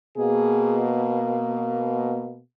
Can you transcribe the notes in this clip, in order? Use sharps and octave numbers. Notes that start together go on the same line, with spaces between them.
B2 A#3 G#4